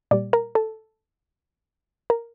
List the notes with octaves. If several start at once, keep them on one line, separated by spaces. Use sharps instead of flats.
A#2 G3 D5
A#4
A4
A#4